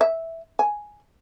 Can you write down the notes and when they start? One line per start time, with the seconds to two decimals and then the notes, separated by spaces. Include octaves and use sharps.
0.01 E5
0.59 G#5